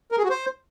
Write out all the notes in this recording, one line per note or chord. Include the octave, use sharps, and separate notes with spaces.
A#4
G#4
F#4
C5